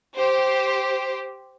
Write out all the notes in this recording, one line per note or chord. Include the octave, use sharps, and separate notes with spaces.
G4 C5